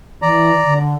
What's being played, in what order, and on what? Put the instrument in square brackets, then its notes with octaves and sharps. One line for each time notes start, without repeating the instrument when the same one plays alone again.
[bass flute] E3 [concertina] D5 A#5
[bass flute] D3